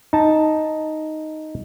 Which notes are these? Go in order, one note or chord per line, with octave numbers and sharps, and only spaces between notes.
D#4 A5